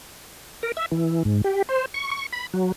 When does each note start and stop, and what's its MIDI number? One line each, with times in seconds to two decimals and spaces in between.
0.63 0.72 70
0.77 0.86 76
0.92 1.23 52
1.25 1.42 44
1.44 1.62 67
1.69 1.86 72
1.94 2.11 85
2.11 2.26 85
2.33 2.47 83
2.54 2.72 54